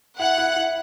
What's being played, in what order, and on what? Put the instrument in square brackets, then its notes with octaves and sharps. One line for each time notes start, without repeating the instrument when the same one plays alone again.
[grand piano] E4 [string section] F#5
[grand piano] E4
E4